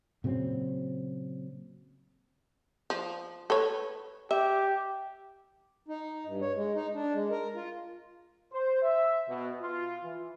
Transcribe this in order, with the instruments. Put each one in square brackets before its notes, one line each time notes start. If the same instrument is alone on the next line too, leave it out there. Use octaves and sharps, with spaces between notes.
[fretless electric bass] A#2 C#3 F#3 C4
[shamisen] F3
A4 B4 C#5
[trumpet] G4 [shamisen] E5
[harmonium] D#4
G2
C#5
G#3
D#4
D4
G#3
A#4
F4
[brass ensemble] C5
E5
B2
F4
E3